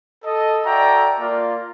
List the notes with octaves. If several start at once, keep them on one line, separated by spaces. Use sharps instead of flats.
A4 D#5
F#4 A4 D5 E5 G5 A#5
A#3 F4 D5